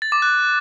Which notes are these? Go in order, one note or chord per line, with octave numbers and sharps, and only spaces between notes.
A6
D6
F#6